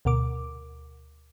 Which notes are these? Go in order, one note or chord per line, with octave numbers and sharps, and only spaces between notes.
D2 B2 A#4 D6